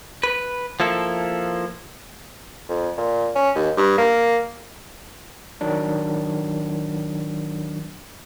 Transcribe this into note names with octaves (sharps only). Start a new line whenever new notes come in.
B4
F3 A#3 E4 A4
F2
A#2
C#4
D#2
G2
A#3
D#3 F#3 D4